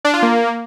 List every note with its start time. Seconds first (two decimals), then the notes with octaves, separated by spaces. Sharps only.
0.05 D4
0.14 F4
0.23 A#3